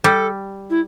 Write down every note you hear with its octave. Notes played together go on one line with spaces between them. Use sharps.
G3 A4
E4